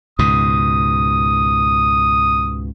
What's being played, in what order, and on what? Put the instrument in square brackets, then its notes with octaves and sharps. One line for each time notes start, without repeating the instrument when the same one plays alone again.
[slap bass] C#2 G#2 B2 [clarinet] D#6